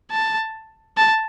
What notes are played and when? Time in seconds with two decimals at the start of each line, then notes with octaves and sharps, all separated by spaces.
0.11 A5
0.97 A5